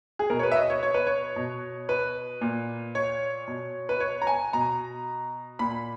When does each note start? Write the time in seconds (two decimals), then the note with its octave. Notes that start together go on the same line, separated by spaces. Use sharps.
0.19 G#4
0.30 B2 A#4
0.39 C#5
0.43 B4
0.51 E5
0.56 D#5
0.70 C#5
0.83 C#5
0.94 B4
1.07 C#5
1.36 B2
1.89 B4
2.41 A#2
2.95 C#5
3.48 B2
3.89 B4
4.00 C#5
4.22 A#5
4.27 G#5
4.53 B2 A#5
5.59 A#2 B5